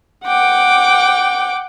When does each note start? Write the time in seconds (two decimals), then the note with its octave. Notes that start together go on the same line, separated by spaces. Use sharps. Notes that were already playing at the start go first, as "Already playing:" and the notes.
0.25 F#5 G5 D6